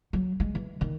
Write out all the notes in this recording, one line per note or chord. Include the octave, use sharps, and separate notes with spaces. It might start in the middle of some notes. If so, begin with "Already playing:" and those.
F#3
G#3
E3
D#3